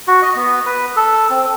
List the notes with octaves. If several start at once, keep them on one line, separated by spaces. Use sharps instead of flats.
F#4
D#5
B3
B4
A4
C4